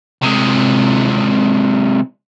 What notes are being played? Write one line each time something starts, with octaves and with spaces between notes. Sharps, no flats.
C3 G#3